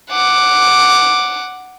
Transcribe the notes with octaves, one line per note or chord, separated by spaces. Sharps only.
F#5 D6